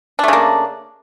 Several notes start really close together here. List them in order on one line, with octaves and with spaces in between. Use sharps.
D4 A3 C#3 A#3